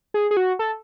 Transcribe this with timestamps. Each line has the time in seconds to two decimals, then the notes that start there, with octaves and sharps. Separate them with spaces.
0.14 G#4
0.31 G#4
0.37 F#4
0.59 A4